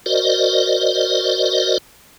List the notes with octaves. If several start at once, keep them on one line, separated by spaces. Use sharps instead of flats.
F#4 A#4 C5 D5 D#5